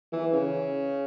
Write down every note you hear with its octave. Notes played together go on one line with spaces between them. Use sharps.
E3
C#3